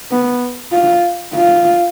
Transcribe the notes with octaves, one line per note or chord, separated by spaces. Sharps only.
B3
F4
F4